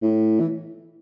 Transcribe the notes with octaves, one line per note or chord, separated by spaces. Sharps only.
A2
E3